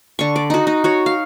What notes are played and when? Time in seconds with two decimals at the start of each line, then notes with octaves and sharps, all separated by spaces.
0.19 D3 C#6
0.36 D5
0.50 D#4 F#4
0.67 D#4
0.84 F#4 C#5
1.06 F5